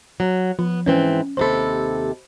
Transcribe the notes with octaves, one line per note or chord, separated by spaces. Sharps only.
F#3
F3 B3
G#2 E3 C4 C#4
D#2 C3 A4 C5 B5